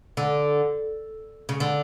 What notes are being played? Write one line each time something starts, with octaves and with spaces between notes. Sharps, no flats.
D3
C#3
D3